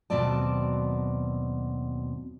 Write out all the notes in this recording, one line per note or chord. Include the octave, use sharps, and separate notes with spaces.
D#2 B2 F#3 C4 D5 A5